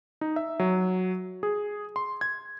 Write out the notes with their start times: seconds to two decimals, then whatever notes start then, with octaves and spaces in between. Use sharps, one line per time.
0.21 D#4
0.36 E5
0.59 F#3
1.43 G#4
1.96 C6
2.21 G#6